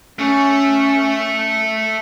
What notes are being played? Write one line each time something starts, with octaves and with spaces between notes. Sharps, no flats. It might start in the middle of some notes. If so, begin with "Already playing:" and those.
A3 C#4